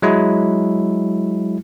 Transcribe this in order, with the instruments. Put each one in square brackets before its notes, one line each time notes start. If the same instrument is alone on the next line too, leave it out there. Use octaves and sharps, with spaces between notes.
[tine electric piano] F#3 G#3 E4